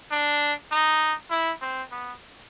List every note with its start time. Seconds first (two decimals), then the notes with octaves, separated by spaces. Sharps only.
0.11 D4
0.72 D#4
1.31 E4
1.62 C4
1.92 B3